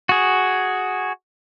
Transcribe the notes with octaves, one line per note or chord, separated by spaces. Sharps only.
F#4 G#4